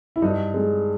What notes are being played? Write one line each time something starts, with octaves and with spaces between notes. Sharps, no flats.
E4
G2 D#4
G#3